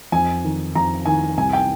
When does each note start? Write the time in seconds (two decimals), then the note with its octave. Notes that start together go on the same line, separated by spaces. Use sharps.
0.12 F2 G#5
0.44 D#3
0.75 F2 A#5
1.05 D#3 G#5
1.37 C2 G#5
1.53 G5